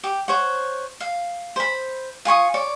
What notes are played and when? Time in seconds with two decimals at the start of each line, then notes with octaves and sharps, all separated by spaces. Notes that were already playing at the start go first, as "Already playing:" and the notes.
0.04 G4
0.28 C5 C#5 F#5
1.00 F5
1.56 C5 B5
2.25 F4 G#5 C#6 D#6
2.54 C#5 D5